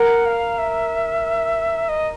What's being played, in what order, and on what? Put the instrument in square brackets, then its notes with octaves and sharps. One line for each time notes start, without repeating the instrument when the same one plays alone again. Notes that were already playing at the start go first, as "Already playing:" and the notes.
Already playing: [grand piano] A#4 [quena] F#5
[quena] F5
E5
D#5